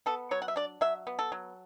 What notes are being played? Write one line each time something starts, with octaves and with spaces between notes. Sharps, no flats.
B3 A4
F#3 C#5
F#5
E5
D4 D5
F#3 E5
B3
A4
F#3